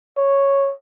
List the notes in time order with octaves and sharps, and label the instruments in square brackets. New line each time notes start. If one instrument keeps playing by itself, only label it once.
[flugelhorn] C#5